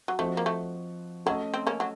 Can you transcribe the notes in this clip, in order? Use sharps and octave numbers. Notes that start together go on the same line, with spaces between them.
F#3
F3 A3 C4 F#4 C5 D#5
A#3
A3
F#3 A3 C#4 A4 D#5
C4
A#3 C#4
F#3